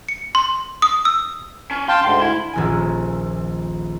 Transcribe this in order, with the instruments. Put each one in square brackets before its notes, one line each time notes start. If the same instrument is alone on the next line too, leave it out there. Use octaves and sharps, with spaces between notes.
[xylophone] C#7
C6
D#6
E6
[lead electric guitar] C#4
[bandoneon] F5 G5 A5 [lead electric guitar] C6
[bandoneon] D2 G#2 D3 [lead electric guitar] C6
[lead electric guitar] E4
[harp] D#1 A#1 G#5